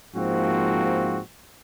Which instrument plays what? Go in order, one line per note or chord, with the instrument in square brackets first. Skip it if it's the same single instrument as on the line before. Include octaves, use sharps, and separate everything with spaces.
[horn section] G#2 F3 A#3 C4 F#4